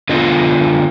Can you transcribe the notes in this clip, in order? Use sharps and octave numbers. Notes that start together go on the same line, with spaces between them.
D3 B3 F4 D#5